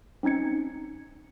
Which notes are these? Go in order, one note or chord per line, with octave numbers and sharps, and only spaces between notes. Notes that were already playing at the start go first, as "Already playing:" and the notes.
C4 C#4 D#4 G#6 C#7